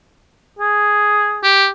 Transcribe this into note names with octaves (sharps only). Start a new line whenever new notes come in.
G#4
G4